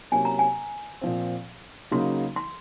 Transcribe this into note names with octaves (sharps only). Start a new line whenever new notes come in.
C3 F#3 A#3 C#4 G#5
A#5
G#5
A#2 F3 C4
C#3 F#3 A#3 D#4 C6
C6